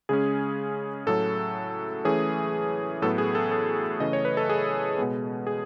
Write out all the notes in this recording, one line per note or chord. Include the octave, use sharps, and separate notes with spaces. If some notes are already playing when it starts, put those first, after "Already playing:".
C#3 G#3 C#4 G#4
A2 F#3 C#4 A4
E3 A3 C#4 G#4
A2 F#3 B3 A4
G#4
A4
A4
C#3 E3 A3 C#4 D#5
C#5
B4
A4
G#4
B2 G#3 B3
G#4